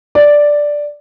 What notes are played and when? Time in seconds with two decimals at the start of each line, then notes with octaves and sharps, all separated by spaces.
0.15 D5